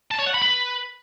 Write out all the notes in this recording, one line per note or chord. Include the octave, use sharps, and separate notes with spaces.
A5
C#5
F#5
B5
B4